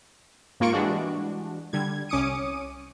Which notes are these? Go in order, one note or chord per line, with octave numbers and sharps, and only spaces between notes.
G#2 A#3 F4 C#6 D7
E3 G3 G#3 D4 F#4
D3 G3 G#6
C2 C#4 D6 D#6 C#7 D#7